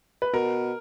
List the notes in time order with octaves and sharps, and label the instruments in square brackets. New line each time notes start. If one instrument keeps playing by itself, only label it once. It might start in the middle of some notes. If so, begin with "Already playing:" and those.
[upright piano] B4
[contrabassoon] B2 [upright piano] A#4